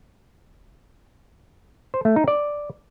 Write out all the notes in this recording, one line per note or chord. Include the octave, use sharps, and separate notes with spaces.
C5
A3
D#4
D5